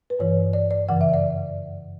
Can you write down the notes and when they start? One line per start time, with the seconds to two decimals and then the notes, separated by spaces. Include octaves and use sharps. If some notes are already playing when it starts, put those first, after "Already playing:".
0.10 B4
0.19 G2 E3 C#5
0.53 D5
0.71 D5
0.89 F#2 C#3 E3 F#5
1.01 E5
1.14 D5